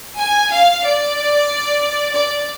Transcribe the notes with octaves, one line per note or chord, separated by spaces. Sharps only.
G#5
F5
D5
D5